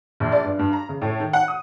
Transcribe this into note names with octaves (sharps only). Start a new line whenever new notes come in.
A#1
D5
G2
G2
A#5
C#3
A2
D#3
F#5
D#6